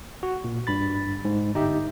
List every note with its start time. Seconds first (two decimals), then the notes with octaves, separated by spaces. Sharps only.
0.23 F#4
0.44 A#2
0.67 G2 B5 A6
1.25 G#2
1.54 G1 D#4 G4 E5